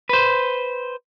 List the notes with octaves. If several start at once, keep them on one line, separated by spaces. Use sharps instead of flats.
B4 C5